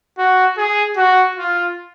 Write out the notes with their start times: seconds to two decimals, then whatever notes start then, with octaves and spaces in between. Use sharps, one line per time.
0.19 F#4
0.58 G#4
0.97 F#4
1.37 F4